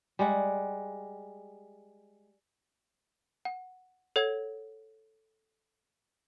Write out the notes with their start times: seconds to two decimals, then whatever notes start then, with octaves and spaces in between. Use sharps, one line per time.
0.19 G3 G#3 F#5
3.45 F#5
4.16 A4 C#5 F#5 G#6